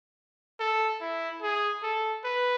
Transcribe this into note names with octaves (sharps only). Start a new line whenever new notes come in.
A4
E4
G#4
A4
B4